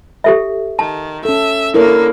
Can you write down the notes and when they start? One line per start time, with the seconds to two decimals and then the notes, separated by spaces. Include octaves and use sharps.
0.24 G4 A4 E5
0.79 D#3 A5
1.25 C#4 A4 E5
1.74 D3 A#3 E4 A#4 C#5